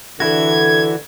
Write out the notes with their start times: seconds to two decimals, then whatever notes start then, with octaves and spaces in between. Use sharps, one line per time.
0.20 D3 E3 D4 E4 F#4 A4 G#6